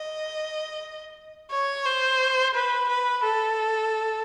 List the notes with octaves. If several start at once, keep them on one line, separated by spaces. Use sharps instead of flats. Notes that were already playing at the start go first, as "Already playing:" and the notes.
Already playing: D#5
C#5
C5
B4
B4
A4